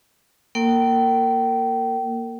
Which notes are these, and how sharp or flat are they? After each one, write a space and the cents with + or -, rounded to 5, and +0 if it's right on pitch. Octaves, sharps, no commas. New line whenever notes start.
A#3 +0 A#4 -35 G5 -30